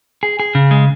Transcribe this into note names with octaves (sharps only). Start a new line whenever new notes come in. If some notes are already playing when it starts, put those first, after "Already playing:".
G#4
G#4
C#3
G#3